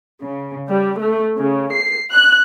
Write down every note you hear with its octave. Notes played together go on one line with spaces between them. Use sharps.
C#3
G3
A3
C#3
C7
F#6